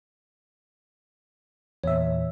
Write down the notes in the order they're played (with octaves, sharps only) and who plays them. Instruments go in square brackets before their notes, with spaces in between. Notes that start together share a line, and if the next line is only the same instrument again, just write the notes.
[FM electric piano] E2 A#2 E5 [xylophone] C#5